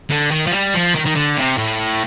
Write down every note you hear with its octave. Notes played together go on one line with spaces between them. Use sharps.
D3
D#3
F3
G3
F3
D#3
D#3
D3
C3
A2